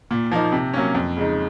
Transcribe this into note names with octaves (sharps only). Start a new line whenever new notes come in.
A#2
F3 A#3 D#4
C3
F#3 A#3 C#4
F2
C#3 G#3 D#4